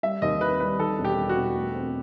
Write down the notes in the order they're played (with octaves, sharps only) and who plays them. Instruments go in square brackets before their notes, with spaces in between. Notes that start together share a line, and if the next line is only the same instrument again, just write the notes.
[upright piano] G3 [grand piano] E5
[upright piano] D#2 [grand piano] D#5
[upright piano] D#3 [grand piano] B4
[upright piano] G3 [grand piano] B4
[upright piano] D#3 [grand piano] A4
[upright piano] E1
[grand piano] G4
[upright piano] G3
[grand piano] F#4
[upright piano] E1
A3
C4